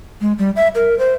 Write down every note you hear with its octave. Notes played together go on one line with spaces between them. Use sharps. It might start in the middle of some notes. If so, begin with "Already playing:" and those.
G#3
G3
E5
A#4
C5